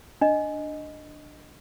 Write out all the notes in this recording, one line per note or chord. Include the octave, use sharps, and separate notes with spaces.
D4 D#5